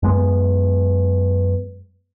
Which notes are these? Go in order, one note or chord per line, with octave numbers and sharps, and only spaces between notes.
F#2 G#3 B3